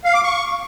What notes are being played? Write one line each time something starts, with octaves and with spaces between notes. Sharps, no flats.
F5
D6
C#6